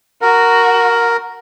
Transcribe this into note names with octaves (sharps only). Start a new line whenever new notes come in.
F#4 A#4